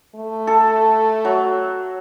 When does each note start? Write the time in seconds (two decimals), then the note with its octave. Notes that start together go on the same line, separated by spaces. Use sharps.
0.15 A3
0.47 A4
1.25 F#3